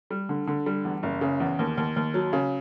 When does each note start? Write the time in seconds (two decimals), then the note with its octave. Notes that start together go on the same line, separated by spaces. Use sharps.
0.10 G3
0.29 D3
0.47 D3
0.66 G3
0.85 E2
1.03 F#1
1.21 C#3
1.40 E2
1.59 D#2
1.77 D#2
1.96 D#2
2.14 F#3
2.33 C#3